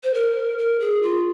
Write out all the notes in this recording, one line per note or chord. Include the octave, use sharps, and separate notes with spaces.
C5
A#4
A#4
G#4
F4